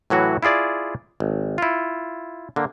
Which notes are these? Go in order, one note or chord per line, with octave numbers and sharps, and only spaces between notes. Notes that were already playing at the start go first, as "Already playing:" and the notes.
A2 E3 F#3 F#4
E4 F4 G#4 D5
G#1
E4 F4
D3 A#3